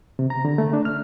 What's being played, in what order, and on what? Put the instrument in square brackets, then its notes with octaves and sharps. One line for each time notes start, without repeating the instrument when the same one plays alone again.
[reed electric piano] C3
A#5
D3
A3
D4
F6